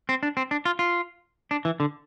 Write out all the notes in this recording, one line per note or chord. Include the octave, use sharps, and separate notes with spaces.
C4
D4
C4
D4
F4
F4
D4
E3
D3